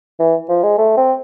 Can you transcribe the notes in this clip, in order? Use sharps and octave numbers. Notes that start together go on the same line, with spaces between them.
E3
F3
G#3
A3
C4